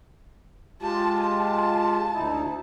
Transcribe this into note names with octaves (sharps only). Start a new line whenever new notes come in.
G#3 F4 G4 A5
A5
D2 D#4 E4